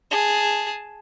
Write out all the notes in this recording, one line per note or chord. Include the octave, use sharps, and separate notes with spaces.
G#4 A5